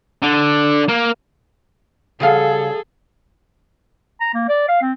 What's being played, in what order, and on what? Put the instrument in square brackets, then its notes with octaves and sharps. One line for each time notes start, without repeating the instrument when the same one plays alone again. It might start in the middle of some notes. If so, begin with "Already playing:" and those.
[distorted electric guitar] D3
A#3
[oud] C#3 G3 F5 [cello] G#4 A4
[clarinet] A#5
A#3
D5
F5
C4